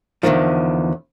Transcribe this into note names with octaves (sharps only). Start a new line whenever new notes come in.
E2 A#2 D3 D#3 F3